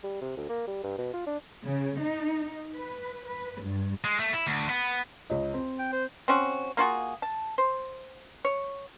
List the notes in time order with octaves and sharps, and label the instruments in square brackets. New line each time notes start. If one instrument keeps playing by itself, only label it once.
[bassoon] G3
C3
D2
A#3
G3
G2
B2
F4
D4
[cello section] C#3
D#4
B4
B4
G2
[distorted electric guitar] G#3
A3
E4
D2
B3
[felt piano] C#2 C#5 D#5
C4
[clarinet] G5
C5
[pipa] C4 C#4 F#4
A#3 F4 F#4 G#4
A5
C5
C#5